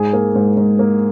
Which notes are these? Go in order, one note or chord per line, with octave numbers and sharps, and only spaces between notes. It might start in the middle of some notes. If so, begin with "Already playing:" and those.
Already playing: G#2 G#4
A#3
G#2
G#2
A#3